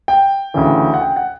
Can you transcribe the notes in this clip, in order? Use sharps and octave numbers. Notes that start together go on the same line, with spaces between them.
G5
D2 C#3 E3
F#5
G5
F#5